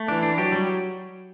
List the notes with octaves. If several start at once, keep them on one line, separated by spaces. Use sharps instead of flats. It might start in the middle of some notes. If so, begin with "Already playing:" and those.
Already playing: A3
E3 D4
D4
F#3 G4
G3